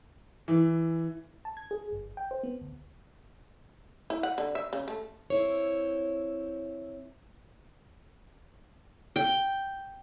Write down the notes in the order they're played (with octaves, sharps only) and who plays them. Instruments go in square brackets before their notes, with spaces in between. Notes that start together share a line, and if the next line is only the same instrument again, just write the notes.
[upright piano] E3
[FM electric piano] A5
G#6
G#4
G1
G5
C5
B3
D2
[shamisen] E4
F#5
D3
E5
C#3
A3
[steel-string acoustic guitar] C4 E4 C#5
[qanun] G5